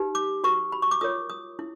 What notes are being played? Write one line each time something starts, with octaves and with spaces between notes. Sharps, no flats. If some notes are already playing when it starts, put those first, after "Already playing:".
Already playing: D#4 G4 B4
D6
F#4 B4 C#6
B5
C#6
D6
F4 A#4 C#5 D#6
D#6
E4